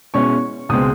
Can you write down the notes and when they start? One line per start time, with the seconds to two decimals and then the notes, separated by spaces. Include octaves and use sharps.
0.14 B2 G#3 C#4 E4 C#6
0.69 C#2 B2 G#3 C4 D#6